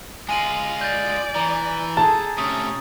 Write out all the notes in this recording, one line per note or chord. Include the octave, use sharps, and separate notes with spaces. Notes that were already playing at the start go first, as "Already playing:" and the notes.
G#3 F4 G#5 D#7 F#7
D5 G6 A6
E3 A#5
G#4 A4 A5 A6
C3 A3 C#4 D#6